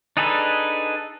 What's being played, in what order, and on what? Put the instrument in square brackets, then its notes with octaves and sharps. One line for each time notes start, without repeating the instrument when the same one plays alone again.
[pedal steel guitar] D4 D#4 G#4 A4 B4